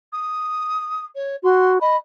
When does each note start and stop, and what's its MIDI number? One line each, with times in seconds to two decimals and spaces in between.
0.12 1.05 87
1.15 1.36 73
1.43 1.78 66
1.43 1.73 84
1.81 1.95 75
1.81 1.97 83